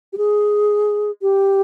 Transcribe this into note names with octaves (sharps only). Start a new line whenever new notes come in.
G4
G#4
G4